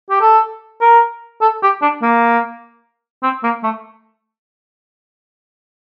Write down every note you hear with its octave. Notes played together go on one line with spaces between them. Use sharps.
G4
A4
A#4
A4
G4
D4
A#3
C4
A#3
A3